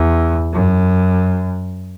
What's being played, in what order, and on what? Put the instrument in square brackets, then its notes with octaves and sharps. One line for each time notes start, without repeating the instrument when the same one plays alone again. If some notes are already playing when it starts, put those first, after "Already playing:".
Already playing: [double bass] E2
F#2